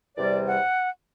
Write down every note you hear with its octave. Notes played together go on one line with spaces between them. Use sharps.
E2 C3 G3 D5
F#5